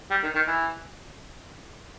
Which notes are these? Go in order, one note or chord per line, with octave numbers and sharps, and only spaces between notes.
G3
D#3
D#3
E3